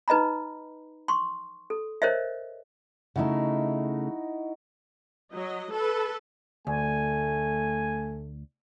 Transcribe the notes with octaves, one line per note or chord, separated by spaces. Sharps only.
D#4 B4 D#5 A#5 B5
C6 C#6
A4
A#4 C5 C#5 D#5 E5
C#3 A3 D#4 E4 F#4
F#3 D#5
A4 B4
D2 A3 G#5